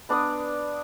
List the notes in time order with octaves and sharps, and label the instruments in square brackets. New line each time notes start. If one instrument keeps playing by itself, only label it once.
[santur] B3 D4 D5 D#6